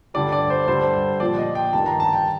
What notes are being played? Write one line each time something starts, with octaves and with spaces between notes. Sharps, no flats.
G2 D3 G3 D5
D5
C5
G2 D3 G3 C5
A#2 F3 D5
D#5
G5
G2 D#3 G3 A5
A#5
A5
G5